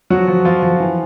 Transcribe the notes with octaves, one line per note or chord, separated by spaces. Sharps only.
F3 F#3 F#4
F3
F3 F4
F3
E3